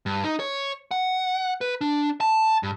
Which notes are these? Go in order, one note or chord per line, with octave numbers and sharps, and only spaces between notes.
G2
D#4
C#5
F#5
B4
D4
A5
G2